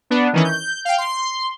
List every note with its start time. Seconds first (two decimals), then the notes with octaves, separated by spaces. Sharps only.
0.10 B3 D4
0.33 D#3 E3 C#4
0.45 G6
0.85 F5 G5
0.98 C6